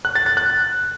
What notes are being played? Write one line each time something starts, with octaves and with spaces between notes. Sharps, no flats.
F#6
A6
A6
F#6